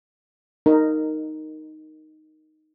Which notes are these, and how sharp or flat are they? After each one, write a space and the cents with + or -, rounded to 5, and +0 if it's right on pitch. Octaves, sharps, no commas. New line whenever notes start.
D#4 +0 A#4 -10